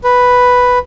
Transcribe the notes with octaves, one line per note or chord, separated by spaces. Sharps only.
B4